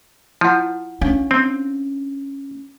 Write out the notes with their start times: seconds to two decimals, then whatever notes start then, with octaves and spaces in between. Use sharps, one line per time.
0.41 F3 E4 F#5
1.01 C#4 D4 F5
1.31 C4